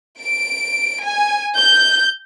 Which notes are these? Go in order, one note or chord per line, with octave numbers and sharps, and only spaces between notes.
D7
G#5
G6